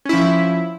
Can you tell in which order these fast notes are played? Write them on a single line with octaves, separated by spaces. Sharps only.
C#4 E4 F3